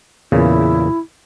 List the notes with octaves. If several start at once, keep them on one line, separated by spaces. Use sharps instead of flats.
E2 A#2 C#3 E4